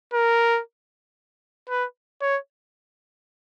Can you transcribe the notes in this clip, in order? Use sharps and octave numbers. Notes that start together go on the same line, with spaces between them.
A#4
B4
C#5